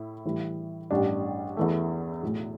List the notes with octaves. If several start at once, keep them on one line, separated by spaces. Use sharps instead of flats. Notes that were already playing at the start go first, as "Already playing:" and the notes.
Already playing: A2 E4
A2 E3 G3 E4
A1 G2 G3 D4
E2 E3 A3
B1 A2 A3